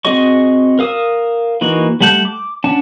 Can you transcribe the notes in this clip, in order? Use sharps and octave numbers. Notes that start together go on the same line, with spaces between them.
C4 F#4 G#4 D#5 C#6
A#4 F5 D#6 E6
E3 A#3 D#4 F#4
G3 A3 F#5 A5 G6
D6
C#4 D4 F#5 A5